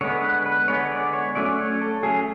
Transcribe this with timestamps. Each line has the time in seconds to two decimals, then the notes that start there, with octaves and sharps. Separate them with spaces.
0.01 D3 G#3 B3 C#5
0.24 B4
0.46 B4
0.68 D3 G#3 B3 C#5
0.92 D5
1.13 C#5
1.35 F#3 A3 C#4 D5
1.59 C#5
1.81 A4
2.03 F#3 A3 C#4 G#4